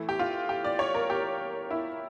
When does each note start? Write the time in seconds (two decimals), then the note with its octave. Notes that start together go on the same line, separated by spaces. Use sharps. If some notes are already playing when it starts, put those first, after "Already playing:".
Already playing: E3 A3 E4
0.09 G4
0.19 F4
0.49 G4
0.64 D5
0.79 C#5
0.94 A#4
1.10 G4
1.71 E4